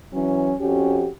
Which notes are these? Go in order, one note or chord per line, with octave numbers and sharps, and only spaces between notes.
E3 F#3 C#4
F2 C#4 F#4 G4